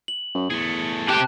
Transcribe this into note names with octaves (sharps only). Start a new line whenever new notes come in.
F#7
F#2
E2 A3 G#4
C3 G4 G5 A5 F#6